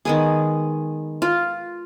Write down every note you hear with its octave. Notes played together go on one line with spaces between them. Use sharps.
D#3 G#3 B3 G#4
F4